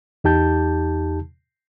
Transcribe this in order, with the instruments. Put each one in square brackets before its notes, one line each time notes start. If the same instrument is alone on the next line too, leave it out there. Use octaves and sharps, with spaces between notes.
[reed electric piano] E2 D#4 G4 A5 G6